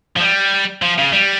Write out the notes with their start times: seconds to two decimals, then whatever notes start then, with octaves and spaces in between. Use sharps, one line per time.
0.16 F3
0.20 G3
0.82 F3
0.98 C#3
1.13 G3